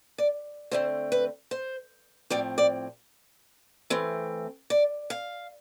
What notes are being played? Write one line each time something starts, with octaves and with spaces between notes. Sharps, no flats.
D5
D3 A3 C4 C5
B4
C5
A2 F3 C4 D5
D5
E3 A3 C4
D5
F5